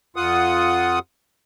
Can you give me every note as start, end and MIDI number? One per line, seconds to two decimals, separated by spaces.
0.16 0.99 41
0.16 0.99 65
0.16 0.99 78
0.16 0.99 87